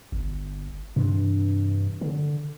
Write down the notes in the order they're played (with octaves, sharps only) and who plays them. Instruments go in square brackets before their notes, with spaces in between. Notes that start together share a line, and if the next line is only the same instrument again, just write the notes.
[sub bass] G1
[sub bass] G2 [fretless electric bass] C3 E3 D4
[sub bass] D3